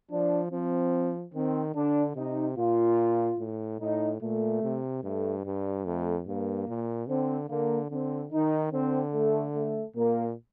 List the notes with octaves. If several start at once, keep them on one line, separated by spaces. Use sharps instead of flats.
F3 D4
F3 C4
D#3 C4
D3 D4
C3 D#4
A#2 F4
A2
A2 D#4
A#2 A3
C3
G2 A3
G2 G3
F2 A3
G2 A#3
A#2
D3 C4
D3 A#3
D3 C4
D#3 D#4
D3 C4
A3
A3
A#2 A#3